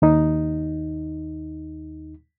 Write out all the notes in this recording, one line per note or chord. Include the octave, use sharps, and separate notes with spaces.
D#2 D#4